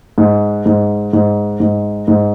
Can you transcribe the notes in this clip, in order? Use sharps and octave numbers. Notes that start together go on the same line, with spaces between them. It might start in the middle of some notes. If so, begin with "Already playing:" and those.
G#2
G#2
G#2
G#2
G#2